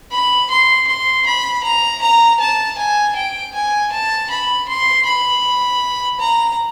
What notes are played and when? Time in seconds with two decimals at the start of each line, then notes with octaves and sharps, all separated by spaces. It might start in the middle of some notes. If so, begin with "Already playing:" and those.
0.12 B5
0.51 C6
0.88 C6
1.26 B5
1.64 A#5
2.02 A#5
2.40 A5
2.79 G#5
3.16 G5
3.55 G#5
3.92 A5
4.30 B5
4.69 C6
5.06 B5
6.20 A#5